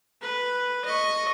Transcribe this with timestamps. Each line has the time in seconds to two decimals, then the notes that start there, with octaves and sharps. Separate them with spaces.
0.22 B4
0.85 D#5 C#6